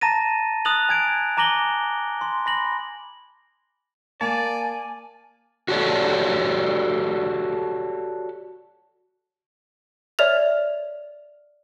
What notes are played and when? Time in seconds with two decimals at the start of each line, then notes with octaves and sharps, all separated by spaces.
0.01 A5 A#5 A6 A#6 D#7
0.65 D#6 F#6 A6 F7 F#7
0.89 G#5 G#6 D7
1.37 G#5 A#5 D6 A#6 F#7 G7
2.21 C6
2.46 B5 A#6 F#7
4.21 A#3 D5 G#5 A5
5.68 F#4 G4 A4 C#5 D5
10.19 C#5 D5 E5 F6 F7